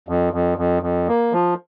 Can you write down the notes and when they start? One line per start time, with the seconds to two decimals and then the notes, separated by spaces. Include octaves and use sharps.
0.08 F2
0.33 F2
0.58 F2
0.83 F2
1.08 A#3
1.33 F3